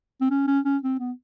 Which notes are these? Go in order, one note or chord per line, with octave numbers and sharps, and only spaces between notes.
C4
C#4
C#4
C#4
C4
B3